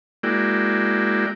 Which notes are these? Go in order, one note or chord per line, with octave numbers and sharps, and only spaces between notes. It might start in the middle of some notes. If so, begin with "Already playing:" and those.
G#3 A#3 E4 F#4 D5 G5